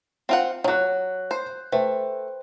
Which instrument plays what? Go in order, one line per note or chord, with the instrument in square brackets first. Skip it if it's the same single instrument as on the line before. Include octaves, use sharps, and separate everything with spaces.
[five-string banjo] C4 F4 F#5
[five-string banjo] D#3 F#3 [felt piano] C#5 F#6
[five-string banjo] C5
[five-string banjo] A3 [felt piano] B4 C5 G5